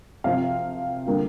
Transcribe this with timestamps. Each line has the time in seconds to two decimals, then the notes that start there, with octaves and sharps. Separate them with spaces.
0.24 C3 F3 C4 F4 F5
1.06 D3 G3 A#3 F4